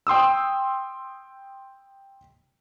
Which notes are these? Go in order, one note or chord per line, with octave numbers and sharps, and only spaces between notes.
G5 C6 D#6 E6